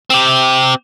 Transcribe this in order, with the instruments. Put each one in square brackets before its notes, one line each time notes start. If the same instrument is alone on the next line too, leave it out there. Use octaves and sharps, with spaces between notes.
[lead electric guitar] C4 G4